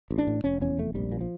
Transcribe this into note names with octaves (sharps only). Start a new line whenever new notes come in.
A1
D4
A2
F1 C#4
E2 C#4
F1 A3
A#1 G3
A#2
F3